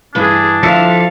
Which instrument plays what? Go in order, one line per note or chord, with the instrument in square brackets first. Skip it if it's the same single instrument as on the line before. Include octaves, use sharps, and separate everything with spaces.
[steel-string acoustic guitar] G2 E3 [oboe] D4 [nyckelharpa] E4 G#4
[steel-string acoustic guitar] D3 [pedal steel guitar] F3 A4 E5 [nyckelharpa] F5 A5